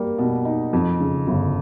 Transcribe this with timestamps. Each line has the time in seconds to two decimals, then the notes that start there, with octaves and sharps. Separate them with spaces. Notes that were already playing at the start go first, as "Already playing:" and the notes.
Already playing: G3 A#3
0.18 B2
0.45 D#4
0.73 F2
1.00 C#3
1.27 G1